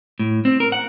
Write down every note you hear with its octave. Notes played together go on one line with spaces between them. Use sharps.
A2
C4
A#4
F#5